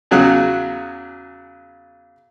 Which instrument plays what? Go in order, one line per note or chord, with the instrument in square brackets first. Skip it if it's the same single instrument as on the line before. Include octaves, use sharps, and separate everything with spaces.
[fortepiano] E2 C#3 F#3 F#4 F#6